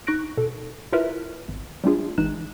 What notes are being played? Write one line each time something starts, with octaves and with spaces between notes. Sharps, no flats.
D#4 C#6 F#6 A#6 D7
B2 A4
E4 F4 A#4 B4 E5
G#1
G3 A3 D4 F4 G#4
G#1 E3 G#3 D#4 F#6 E7